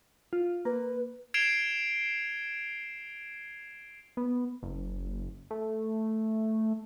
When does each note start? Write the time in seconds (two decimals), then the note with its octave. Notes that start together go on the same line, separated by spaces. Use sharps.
0.33 F4
0.65 A#3 B4
1.34 G#6 C7 D7 E7 F7 G7
4.17 B3
4.63 F#1
5.51 A3